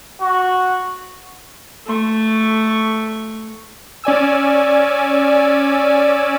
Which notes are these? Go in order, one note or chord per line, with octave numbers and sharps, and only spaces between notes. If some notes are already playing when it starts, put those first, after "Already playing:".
F#4
A3 C#6
C#4 D5 G#5 E6